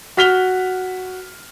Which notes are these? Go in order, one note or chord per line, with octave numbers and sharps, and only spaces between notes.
F#4 F6 B6 F7 G7